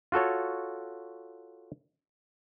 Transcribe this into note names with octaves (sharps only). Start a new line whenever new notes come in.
F4 F#4 A4 C#5